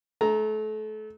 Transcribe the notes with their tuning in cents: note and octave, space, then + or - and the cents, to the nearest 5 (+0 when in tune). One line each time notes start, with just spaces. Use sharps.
A3 -30 A#5 +0